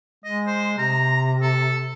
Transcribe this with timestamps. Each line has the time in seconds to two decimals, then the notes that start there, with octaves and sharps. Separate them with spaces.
0.25 G#3 D#5
0.47 C5
0.79 C3 A#5
1.42 A4